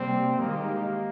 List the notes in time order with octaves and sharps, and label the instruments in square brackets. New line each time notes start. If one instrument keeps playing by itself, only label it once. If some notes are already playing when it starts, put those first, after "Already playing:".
Already playing: [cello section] C3 G3 A#3 [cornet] C4
[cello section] D#3 G#3 D#4 G4 [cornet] A#3